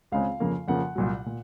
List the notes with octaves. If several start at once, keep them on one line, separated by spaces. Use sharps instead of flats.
C#2 C#3 G#3 C4 F5
F2 C#3 F3 A#3
F2 C#3 F3 A#3 F#5
C2 A#2 F#3
A#2